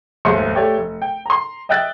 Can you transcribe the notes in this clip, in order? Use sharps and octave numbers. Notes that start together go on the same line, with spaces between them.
F1 D#2 G#2 E5 C6 C#7
A3 G4 C#5 D5 G5
F1
G5
A#5 C6
D#5 E5 G5 E6 F#6 A6